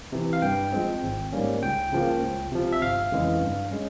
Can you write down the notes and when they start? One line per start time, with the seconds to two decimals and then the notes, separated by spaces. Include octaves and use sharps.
0.12 C3 E3
0.33 F5
0.42 G2 G5
0.72 F3 G#3 C4
1.03 G#1
1.32 G#2 G3 A#3 C#4
1.63 C#2 G5
1.92 C#3 F3 A#3
2.22 C#2
2.52 C3 F3
2.73 E5
2.82 G1 F5
3.12 F2 C#3 E3 G#3
3.42 G2
3.71 G#3 C#4